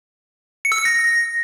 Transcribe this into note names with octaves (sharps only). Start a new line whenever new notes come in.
C#7
E6
C#7
A#6